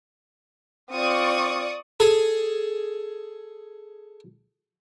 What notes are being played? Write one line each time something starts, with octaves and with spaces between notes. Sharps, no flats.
C4 F4 D5 C#6 D#6
G#4 A4